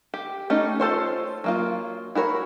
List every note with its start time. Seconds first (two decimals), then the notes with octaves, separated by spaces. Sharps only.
0.14 G4
0.50 A3 C#4 D#4 G4
0.80 F4 A4 C5 C#5
1.44 F#3 A#3 F4
2.15 E4 F#4 A#4 C#5